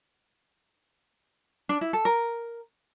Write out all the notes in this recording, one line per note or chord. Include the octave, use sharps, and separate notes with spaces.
D4
E4
A4
A#4